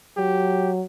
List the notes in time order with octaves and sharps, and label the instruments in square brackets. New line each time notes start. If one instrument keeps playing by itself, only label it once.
[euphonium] F#3 [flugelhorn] G4